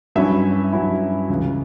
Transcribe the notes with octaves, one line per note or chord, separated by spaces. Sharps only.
G2 F#3 C#4 E4 E5
G2 F#3 C#4 E4
C#2 C#3 E3